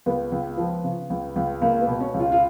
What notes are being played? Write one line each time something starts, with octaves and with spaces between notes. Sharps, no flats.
C#2 B3
C#2
F3
C#3
C#2
C#2
C#2 A#3
B3
B2
C#4
C#2
F4
F4